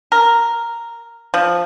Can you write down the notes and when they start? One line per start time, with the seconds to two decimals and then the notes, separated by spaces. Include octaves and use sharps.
0.12 A#4
1.34 F3